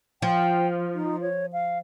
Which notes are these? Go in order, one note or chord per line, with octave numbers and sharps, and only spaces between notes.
F3 G5
D#4
C#5
F5